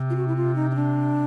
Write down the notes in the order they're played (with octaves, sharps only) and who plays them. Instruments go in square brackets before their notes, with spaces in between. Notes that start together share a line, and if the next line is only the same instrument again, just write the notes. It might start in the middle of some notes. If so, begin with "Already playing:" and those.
Already playing: [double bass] C3
[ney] F4
F#4
E4
F4
D#4
D#4
D4